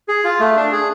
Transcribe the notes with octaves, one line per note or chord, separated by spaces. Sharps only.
G#4
F4
A3
D4
G#4